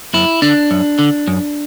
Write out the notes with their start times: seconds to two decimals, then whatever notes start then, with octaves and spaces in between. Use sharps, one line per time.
0.14 F#2 E4
0.42 D3 D4
0.71 F#2
0.99 D3
1.28 F#2